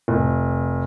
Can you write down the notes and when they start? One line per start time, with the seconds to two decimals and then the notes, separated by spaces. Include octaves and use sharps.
0.08 F1